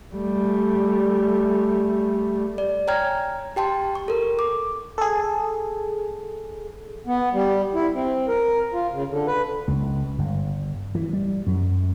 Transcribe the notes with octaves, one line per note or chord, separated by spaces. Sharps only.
G3 A3
D5
C#5 G5 G#5 A#5 F6 G#6
G4 G5 A5 C6
C#6
A4 A#4
D6
G#4 A4
B3
G3
E4
C4
A#4
F4
C#3
D3
B4
C#2
G1
E3
G3
F#2